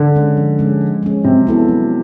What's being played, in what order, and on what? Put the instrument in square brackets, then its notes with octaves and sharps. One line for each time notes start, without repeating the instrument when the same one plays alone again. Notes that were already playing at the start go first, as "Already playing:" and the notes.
Already playing: [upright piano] D3
[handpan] G#3 C#4
F3
G#3 C#4
F3
G#3 C#4
[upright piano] C3 [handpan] F#3
[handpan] B3 E4 A4
F#3